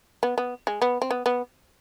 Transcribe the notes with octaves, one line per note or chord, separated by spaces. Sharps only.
B3
B3
G#3
B3
C4
B3
B3